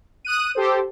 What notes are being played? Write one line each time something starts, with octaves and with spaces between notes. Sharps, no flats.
D#6 F#6 D#7
G4 A4 C5